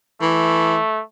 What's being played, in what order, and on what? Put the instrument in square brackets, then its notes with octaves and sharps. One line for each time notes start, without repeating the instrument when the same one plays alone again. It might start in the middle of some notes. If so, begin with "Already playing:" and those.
[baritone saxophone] E3 [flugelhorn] A3